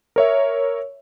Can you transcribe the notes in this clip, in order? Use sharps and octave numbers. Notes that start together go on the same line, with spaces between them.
A#4 C#5 E5